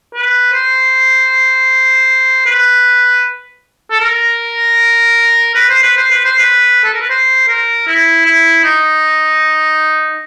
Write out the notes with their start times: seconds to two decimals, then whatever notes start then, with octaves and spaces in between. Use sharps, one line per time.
0.14 B4
0.53 C5
2.45 B4
3.91 A4
4.00 A#4
5.54 B4
5.69 C5
5.82 B4
5.97 C5
6.11 B4
6.24 C5
6.38 B4
6.84 A4
6.93 A#4
7.00 B4
7.10 C5
7.48 A#4
7.87 E4
8.25 E4
8.64 D#4